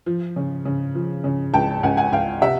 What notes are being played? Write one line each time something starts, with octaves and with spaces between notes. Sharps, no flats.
F3
C#3
C#3
F3
C#3
C#2 G5 A5
C#2 F#5 G#5
F#5 G#5
C#2 F5 G5
C3 E5 F#5